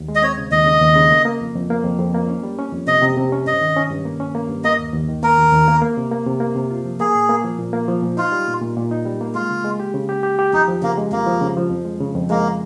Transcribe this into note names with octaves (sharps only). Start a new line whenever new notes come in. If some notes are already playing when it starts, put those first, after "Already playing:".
Already playing: D#2
G#3
D#5
C4 C#5
C#3
D#2 D#5
C#3
D#2
C#3
A#3
A#3
F2
F2
A#3
F2
F2
A#3
C#4
G3
C#4
F2
C3 D#5
C3
C3
C#4
G2 D#5
D#3
C#4
G2
A#3
C#4
A#3
G2
A#3 D#5
D#2
D#2
D#3
A#3 A#4
D#2
D#2
A#3
A#3
C3
A#3
C3
A#3
C3
F4
F3
A#3 G#4
A#2
A#3
F3
A#2
A#3
F3
A#2
D#4 F4
G3
A#2
A#2
A#2
D#4
G3
A#3
G#3 F4
C#3
G#3
G4
C#3
G4
G4
G4
F2 D#4
F3
C#3 A#3
G#3
F2 A#3
F3
C#3
F3
F2
G#3
C#3
F2
G#3 A#3